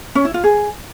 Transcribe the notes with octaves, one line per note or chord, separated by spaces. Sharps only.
C#4
E4
F4
G#4